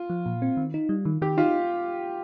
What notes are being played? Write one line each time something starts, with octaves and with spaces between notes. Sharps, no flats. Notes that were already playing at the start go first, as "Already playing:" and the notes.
Already playing: F4
F3
A#2
C4
D#3
D#4
G3
D#3
D#3 G4
D#4 F4